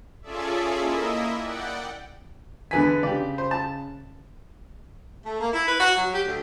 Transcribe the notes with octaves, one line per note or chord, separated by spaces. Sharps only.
C#4 F4 G#4 A4 D5 E5
A#3 E4 D#5 E5
D5 F#5 G5
E2 D3 B4 G#5 B6
C#3 G4 D5
C5
A5
A3
A#3
E4
B4
F#4
F#3
G4
D2